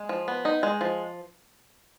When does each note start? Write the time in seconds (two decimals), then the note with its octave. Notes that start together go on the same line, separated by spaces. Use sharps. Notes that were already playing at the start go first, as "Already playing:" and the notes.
Already playing: G#3
0.09 F3
0.28 B3
0.45 D#4
0.63 G#3
0.81 F3